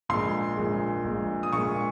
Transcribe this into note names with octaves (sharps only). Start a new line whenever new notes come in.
A#1 A#2 G#3 C6
A#1 A#2 G#3
A#1 A#2 G#3
D#6
A#1 A#2 G#3 C#6